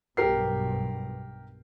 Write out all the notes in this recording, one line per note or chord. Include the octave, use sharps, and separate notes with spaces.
B1 G2 B2 G4 A#4 C7